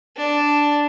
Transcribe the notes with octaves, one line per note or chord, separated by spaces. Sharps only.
D4